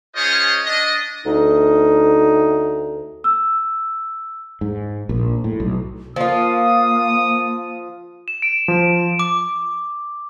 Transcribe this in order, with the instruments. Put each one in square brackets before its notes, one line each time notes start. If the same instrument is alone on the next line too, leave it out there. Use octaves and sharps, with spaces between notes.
[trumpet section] C#4 F4 G#4 C5 C#5 D#5
D4 D#5
[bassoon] D2 [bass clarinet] D#4
[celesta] E6
[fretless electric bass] G#2
A#1
A2
B1
[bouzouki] F3 F4 [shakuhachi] A#3 [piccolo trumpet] D#6
[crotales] E7
D7
[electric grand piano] F3
[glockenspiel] D6